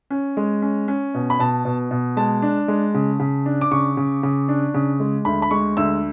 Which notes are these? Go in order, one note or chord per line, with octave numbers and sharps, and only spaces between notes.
C#4
G#3
C#4
C#4
B2
B5
B2 A5
B2
B2
G#3 A5
D4
G#3
C#3
C#3
D4
D6
C#3 C#6
C#3
C#3
D4
C#3
G#3
D2 B5
B5
G#3 C#6
D2 E6